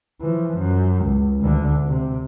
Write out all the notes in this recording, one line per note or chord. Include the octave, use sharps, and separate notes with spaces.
E3 F3
F#2
C#2
D2 D3
C3